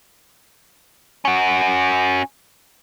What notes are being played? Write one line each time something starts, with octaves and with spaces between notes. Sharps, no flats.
C#4 F#4